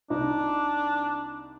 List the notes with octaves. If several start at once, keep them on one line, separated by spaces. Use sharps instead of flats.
C2 D4 D#4